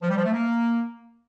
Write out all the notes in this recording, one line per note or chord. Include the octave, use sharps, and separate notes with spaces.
F3
G3
F3
A3
A#3